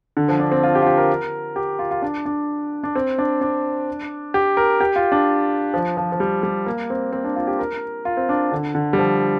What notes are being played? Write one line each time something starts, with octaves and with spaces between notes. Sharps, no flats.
D3
F3
D4
C4
F4
G4
F4
G4
A#4
G4
F4
F4
D4
D4
D4
C4
D4
D4
G4
A#4
G4
F4
D4
F3
F3
F3
G3
G3
A#3
C4
C4
D4
F4
G4
A#4
F4
C4
D4
D3
D3
G3
F3